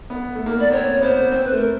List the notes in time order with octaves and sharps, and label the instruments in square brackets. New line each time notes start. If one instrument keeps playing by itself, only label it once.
[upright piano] B3
A3
A#3
[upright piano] B3 [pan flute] D5
[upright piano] C4 [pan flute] C#5
[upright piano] B3 [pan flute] C5
[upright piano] C4 [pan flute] C5
[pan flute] B4
[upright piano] A3
[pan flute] A#4